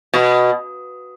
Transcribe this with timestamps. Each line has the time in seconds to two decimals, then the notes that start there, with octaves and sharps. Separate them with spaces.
0.14 B2